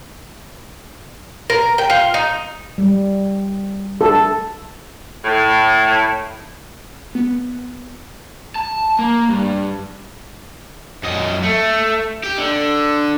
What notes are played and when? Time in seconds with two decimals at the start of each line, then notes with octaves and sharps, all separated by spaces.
1.50 A#4
1.78 G5
1.90 F4
2.14 D#4
2.78 G3
4.01 A4
5.25 A2
7.15 B3
8.56 A5
8.99 A#3
9.29 G2
11.03 F#2 D#5
11.44 A3
12.24 G4
12.38 D3